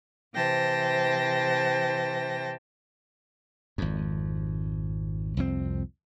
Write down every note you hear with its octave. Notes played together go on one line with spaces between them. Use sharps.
C3 E3 C5 G5 A5 A#6
G#1 F2
C2 F2 C4